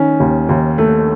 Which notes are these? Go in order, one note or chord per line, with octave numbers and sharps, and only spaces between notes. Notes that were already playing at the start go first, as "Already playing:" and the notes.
Already playing: D#3 C#4
D#2
D#2
A3